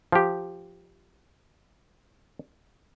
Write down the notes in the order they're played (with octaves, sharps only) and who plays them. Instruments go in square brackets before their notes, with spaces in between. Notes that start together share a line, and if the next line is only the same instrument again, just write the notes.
[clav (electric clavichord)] F3 G4